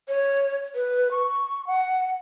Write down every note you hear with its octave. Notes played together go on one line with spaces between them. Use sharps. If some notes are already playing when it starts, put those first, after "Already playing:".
C#5
B4
C#6
F#5